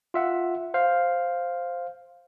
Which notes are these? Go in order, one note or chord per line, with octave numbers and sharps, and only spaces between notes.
F4 E5 F#5
C5 F5